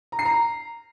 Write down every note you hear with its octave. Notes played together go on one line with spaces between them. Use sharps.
A#5
C7
A#5